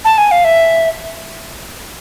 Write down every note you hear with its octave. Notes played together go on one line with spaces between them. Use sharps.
A5
G#5
F5
E5